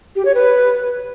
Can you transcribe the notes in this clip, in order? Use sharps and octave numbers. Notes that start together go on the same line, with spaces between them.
G4
C#5
B4